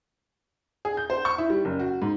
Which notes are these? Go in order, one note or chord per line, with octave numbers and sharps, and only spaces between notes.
G#4
G6
C5
C#6
E4
G3
F#1
F#4
G#2